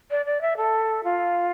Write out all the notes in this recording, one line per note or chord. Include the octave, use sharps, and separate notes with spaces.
D5
D5
E5
A4
F4